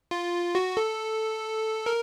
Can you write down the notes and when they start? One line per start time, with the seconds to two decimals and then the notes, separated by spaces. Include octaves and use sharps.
0.11 F4
0.55 F#4
0.77 A4
1.86 A#4